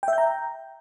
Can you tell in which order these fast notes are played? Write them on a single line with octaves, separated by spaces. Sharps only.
G5 E5 G6 A#5